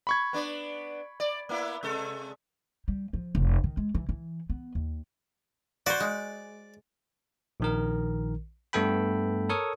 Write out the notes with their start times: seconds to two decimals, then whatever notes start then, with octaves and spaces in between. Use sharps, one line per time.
0.07 B5 C#6 G#6
0.33 B3 D4 B4
1.20 D5
1.49 A#3 B3 E4
1.83 C3 G#3 A4
2.88 G3
3.13 F3
3.35 F1
3.64 D#3
3.77 G#3
3.95 E3
4.09 E3
4.50 B3
4.75 D#2
5.86 F#4 C5 D5
6.00 G#3
7.60 A#1 D#3 A#4
8.73 G2 A3 B3 A4 G5 B5
9.49 A4 A#4 C#5 C#6 D#6